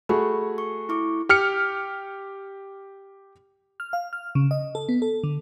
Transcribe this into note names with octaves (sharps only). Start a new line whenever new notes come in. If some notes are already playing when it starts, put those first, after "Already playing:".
A3 F#4 G#4 B5
C#6
E4 C#6 D6
G4 F6 C#7
F6
F5
F6
C#3
D#5
A4
B3
A4
D3